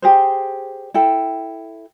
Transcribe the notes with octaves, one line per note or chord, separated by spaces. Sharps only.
G4 G#4 C5
E4 A4 G5